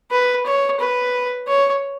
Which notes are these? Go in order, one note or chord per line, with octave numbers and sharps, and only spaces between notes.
B4
C#5
B4
C#5